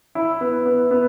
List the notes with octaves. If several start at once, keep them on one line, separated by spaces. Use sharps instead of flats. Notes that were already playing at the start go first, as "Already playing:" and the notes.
E4
B3
B3
B3